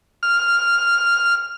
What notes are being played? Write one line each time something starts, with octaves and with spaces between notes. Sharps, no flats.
F6